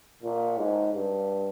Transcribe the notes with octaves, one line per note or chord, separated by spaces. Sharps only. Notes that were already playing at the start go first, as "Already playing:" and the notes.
A#2
G#2
G2